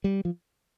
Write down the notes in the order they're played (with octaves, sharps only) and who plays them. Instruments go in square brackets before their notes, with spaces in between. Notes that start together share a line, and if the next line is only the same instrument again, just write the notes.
[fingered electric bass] G3
F3